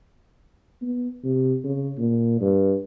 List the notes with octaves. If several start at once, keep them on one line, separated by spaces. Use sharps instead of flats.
B3
C3
C#3
A#2
G2